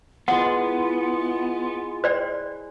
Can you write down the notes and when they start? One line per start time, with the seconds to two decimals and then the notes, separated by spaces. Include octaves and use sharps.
0.28 G#3 B3 E4 F4 F#5 B5
2.04 C5 D5 G5